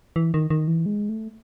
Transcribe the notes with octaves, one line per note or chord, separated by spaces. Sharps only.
E3
D#3
D#3
E3
G#3
A3